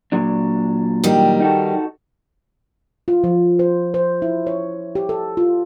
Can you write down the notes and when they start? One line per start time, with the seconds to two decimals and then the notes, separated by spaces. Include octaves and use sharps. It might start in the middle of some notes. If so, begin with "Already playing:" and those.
0.12 A#2 F#3 D4
1.04 D#3 G3
1.40 D#4 F#4 A4
3.08 F4
3.24 F3
3.59 C5
3.94 C5
4.22 E4
4.47 C#5
4.95 G4
5.09 A4
5.37 F4